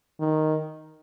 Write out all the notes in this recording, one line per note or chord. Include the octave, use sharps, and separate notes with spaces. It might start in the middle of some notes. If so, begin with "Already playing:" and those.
D#3